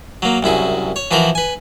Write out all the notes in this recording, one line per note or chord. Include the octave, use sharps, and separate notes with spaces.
F#3 A#3
C2 F#2 E4 G#4
C#5
E3 F3 E4 F#4 A#4
B4 G#5